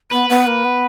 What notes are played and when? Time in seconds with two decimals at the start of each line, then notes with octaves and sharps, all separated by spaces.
0.11 B3 B4
0.29 B3
0.47 A#3
0.65 B3